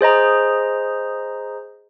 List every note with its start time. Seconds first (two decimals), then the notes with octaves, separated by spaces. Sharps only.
0.01 G#4 C5 D#5 A#5